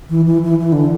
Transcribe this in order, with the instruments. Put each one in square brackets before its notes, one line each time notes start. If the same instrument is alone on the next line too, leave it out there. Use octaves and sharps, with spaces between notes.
[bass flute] E3
E3
E3
E3
D3